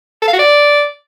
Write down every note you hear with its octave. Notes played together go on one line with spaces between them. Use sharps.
A4
F5
F#4
D5